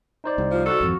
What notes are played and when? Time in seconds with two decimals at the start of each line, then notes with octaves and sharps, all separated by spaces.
0.24 D#4 C5 D5
0.38 C2
0.51 F3
0.66 F#4 A4 C#5 F5
0.81 G#1 F2